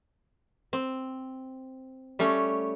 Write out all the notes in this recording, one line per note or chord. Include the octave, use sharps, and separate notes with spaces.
C4
G3 A3 C#4 C#5